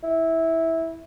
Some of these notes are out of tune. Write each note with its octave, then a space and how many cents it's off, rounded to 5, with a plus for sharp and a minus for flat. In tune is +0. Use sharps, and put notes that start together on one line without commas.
E4 -15